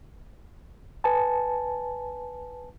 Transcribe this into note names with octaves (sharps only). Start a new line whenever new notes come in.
B4 G#5 A5